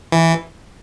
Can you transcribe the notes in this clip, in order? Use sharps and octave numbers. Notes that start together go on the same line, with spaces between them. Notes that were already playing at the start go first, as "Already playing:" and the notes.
E3